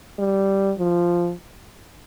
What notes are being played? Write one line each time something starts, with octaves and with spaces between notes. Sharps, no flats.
G3
F3